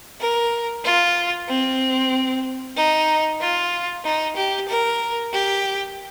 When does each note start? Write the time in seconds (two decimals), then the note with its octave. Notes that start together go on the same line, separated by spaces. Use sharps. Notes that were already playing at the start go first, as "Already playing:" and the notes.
0.20 A#4
0.84 F4
1.48 C4
2.76 D#4
3.40 F4
4.04 D#4
4.36 G4
4.68 A#4
5.33 G4